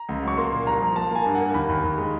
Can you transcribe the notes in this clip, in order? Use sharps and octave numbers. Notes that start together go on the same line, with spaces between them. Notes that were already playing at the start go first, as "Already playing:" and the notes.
Already playing: A#5
C#2
F#3 C#6
A#3 C6
A#2
C2 A#5
F3
A#3 A5
A#3 G#5
G2
F#5
A#3
D#2 B5
D#2
D#2
G#3